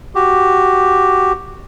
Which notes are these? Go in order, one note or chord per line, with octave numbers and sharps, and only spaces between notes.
F#4 G4